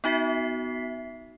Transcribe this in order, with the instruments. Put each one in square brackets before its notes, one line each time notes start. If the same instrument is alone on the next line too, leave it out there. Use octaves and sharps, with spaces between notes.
[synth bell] B3 D#4 F#4 E5 B6 C7